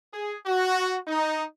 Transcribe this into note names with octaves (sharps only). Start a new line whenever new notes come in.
G#4
F#4
D#4